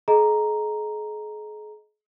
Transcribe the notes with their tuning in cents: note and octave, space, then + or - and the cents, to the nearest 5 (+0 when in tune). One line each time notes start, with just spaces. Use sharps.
G#4 +40 D#5 +0 A#5 +0